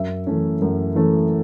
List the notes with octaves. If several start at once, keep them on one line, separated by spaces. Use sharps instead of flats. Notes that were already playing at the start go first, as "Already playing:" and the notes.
Already playing: F#2 E5
E3 A3 C#4
F#2
E3 A3 C#4